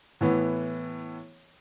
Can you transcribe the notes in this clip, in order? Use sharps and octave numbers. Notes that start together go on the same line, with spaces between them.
A2 E3 B3